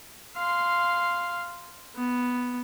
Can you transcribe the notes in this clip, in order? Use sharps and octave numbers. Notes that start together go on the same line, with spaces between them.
F5 C6
B3